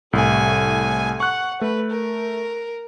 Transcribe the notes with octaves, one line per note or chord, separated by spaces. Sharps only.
C2 A2 A3 G#5
F#5 C#6 F#6
A3 B4
A#4